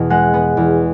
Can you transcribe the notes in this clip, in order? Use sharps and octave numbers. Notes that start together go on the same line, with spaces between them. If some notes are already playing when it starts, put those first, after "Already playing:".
Already playing: E2 B2 B3
G#3 F#5
B3
E2